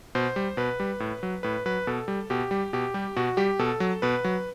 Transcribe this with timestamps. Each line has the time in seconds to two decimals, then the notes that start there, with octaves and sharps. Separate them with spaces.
0.15 B2 C5
0.36 G3
0.57 B2 B4
0.80 G3
1.00 A2
1.23 F#3
1.43 A2 B4
1.66 F#3 B4
1.87 B2 A4
2.08 G3
2.30 B2 G4
2.51 G3
2.73 B2 G4
2.94 G3
3.17 B2 F#4
3.37 G3 G4
3.59 B2 A4
3.80 F#3
4.02 B2 B4
4.24 F#3